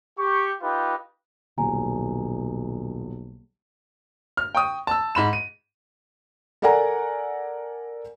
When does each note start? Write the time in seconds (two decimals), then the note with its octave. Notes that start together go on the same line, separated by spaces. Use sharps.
0.18 G4 C#6
0.62 D#4 F4 G4 B4
1.58 D#1 B1 G#5 A#5
4.37 F6
4.55 G5 C#6 D#6
4.87 A5 E6
5.15 G#2 B5 E7
5.33 D#7
6.62 A4 A#4 D5 F#5 G#5 A#5